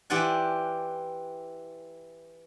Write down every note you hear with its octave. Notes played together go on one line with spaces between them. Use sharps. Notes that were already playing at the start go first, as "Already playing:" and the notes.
E3 G4 C5 D5 F#5 G#5